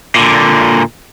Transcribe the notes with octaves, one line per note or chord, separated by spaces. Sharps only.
A#2 D3